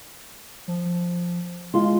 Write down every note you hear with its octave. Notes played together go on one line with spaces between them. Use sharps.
F3
G#3 F4 C6